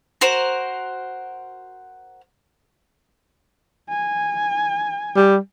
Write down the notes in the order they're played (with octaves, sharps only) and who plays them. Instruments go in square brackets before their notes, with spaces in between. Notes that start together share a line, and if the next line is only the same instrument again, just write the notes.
[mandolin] F#4 A#4 C5
[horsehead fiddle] G#5
[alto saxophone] G3